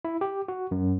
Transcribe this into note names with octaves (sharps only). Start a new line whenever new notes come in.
E4
G4
F#4
F#2